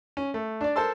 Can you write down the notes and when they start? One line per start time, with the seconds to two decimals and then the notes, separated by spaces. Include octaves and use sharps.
0.17 C#4
0.34 A3
0.61 D4 D5
0.76 A4 A#4 C5 A5 C6 E6